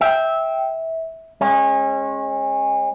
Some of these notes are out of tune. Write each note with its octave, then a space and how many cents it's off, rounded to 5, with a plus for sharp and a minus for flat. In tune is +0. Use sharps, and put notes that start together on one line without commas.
E5 -20 G5 +0
G#3 -10 C#4 -30